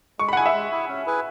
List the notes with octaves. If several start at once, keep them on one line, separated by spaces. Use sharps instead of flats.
G#3 C#6
B5
F#5
E4 G#4 G#5
E5
G#3
E4 G#4
C#4
E4 G#4 B4 G#5